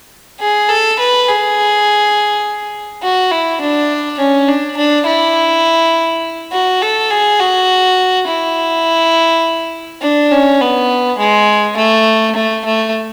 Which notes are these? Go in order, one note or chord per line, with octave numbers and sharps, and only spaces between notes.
G#4
A4
B4
G#4
F#4
E4
D4
C#4
D4
D4
E4
F#4
A4
G#4
F#4
E4
D4
C#4
B3
G#3
A3
A3
A3